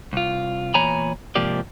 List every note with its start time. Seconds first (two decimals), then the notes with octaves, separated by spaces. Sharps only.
0.13 C2 F4
0.74 E2 A#2 C#5 G#5 A#5 B5
1.35 G#2 C3 F3 A#3 G4 D5